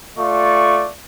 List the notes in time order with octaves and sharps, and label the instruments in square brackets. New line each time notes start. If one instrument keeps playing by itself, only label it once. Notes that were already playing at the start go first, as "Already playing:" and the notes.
[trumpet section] A3 F4 D5 C#6